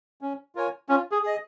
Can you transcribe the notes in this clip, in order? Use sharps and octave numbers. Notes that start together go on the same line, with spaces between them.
C#4
F4 A#4 C#5 G#5
C#4 F4
G#4
G#4 D#5